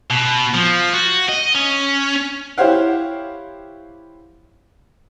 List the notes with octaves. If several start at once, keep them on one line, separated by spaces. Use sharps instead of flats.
B2
F3
F#4
D#5
C#4
E4 G4 C5 C#5 F5 F#5